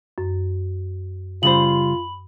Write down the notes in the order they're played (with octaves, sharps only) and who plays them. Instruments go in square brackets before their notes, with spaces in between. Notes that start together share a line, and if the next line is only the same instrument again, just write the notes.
[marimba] F#2
[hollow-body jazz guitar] C#3 G3 C5 [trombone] F4 [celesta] B5 F#7